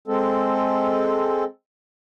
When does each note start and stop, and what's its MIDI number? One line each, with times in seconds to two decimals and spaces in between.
0.08 1.44 56
0.08 1.44 60
0.08 1.44 69